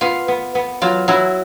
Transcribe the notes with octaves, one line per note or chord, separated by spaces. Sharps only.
B3 F4
B3
B3
F#3 F4
F#3 E4